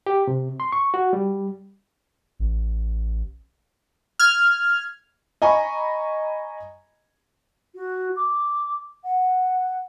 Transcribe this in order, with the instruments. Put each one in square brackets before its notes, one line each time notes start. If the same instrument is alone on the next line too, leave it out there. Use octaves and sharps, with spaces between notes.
[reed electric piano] G4
C3
C6
C#6
F#4
G3
[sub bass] A1
[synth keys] F6 G#6
[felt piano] D#5 G#5 A#5 B5 C#6
[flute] F#4
D6
F#5